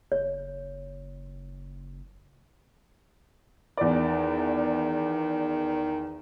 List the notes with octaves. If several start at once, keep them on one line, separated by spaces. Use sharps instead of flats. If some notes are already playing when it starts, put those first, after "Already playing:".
F#1 C#5
E2 D#3 D5